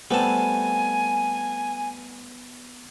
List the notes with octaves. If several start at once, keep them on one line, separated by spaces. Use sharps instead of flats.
G3 A3 B3 C4 G#5 A5